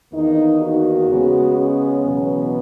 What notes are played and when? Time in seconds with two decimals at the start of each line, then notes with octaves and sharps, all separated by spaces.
0.12 E2 D#3 A#3 D#4
0.60 F#4
1.08 C#3 G#3 B3
1.57 C#4
2.05 E2 B2 F#3 B3